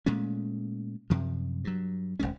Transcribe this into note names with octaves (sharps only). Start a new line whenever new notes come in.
A#2 G#3 A3 C#4
F#2 C3 F3
G2 F#3
D#1 G#1 G#3 C#4